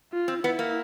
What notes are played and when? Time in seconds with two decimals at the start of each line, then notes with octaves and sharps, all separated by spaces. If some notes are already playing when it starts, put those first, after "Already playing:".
0.12 F4
0.28 C4
0.43 B3 E4
0.59 A#3